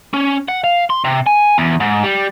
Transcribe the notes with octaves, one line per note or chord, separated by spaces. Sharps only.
C#4
F#5
F5
C6
C3
G#5
E2
G#2
G3